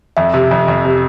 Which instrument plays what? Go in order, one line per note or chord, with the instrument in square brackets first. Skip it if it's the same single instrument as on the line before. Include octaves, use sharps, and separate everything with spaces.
[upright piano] F2 [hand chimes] E5
[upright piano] C3
F2
F2
C3